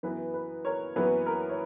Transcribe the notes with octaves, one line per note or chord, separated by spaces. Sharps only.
F#2 E3 B3 E4 B4
B4
A#4 C#5
F#2 E3 B3 E4 B4
A#4
C#5